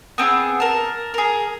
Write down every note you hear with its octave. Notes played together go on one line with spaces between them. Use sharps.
B3 C4 D#4 G#4
A#4 A5
G#4 A#4